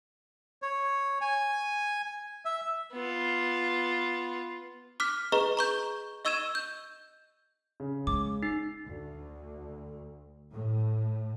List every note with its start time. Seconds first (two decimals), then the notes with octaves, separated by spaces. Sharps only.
0.62 C#5
1.21 G#5
2.45 E5
2.93 B3 F4
5.00 D6 F6 F#6 B6
5.32 G#4 B4 D#5 A#5 C#6
5.57 A#5 C#6 G6
6.25 D#5 C#6 E6 G#6 D#7 E7
6.55 G6
7.80 C#3
8.07 G#3 D6
8.43 D#4 C7
8.86 D2
10.53 A2